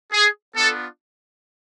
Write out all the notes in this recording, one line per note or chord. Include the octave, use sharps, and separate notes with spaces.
G#4
B3 D4 F4 A4